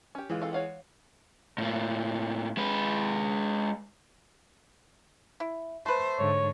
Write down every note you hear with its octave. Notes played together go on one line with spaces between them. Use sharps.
C#4 G4
E3 G#3 F4
C4 A4 F5
C#5 F5 F#5
A2 A#3
G#3 B4
E4
A3 B4 C5
G#2 D3 C#5